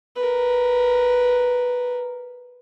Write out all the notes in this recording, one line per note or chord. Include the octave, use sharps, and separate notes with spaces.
A#4 B4